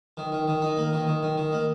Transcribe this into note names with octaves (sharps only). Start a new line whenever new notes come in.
D#3
D#3
D#3
D#4
A#3
D#3
D#3
D#3
D#3
A#3